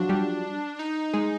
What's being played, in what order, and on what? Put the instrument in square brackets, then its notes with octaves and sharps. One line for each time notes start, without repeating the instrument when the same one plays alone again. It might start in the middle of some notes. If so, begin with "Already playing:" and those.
Already playing: [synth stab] F3 F#3 F4 F#4 [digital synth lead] D4
[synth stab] G3 G4
[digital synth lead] D#4
[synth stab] G#3 G#4